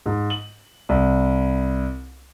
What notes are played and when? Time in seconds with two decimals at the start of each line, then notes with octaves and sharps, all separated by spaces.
0.06 G#2
0.30 F#7
0.89 C2